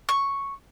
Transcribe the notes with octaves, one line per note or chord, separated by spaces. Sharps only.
C#6